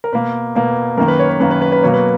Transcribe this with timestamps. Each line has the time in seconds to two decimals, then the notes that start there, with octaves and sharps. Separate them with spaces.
0.04 A#4
0.13 B2 A#3 B4
0.55 B2 A#3
0.97 F#2 D#3 A#3 A#4
1.08 B4
1.19 C#5
1.29 B4
1.40 F#2 D#3 A#3 B4
1.51 B4
1.62 B4
1.72 B4
1.83 B2 F#3 A#3 C#5
1.93 B4